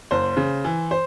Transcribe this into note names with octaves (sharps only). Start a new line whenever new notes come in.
F#1 C5
C#3
E3
C5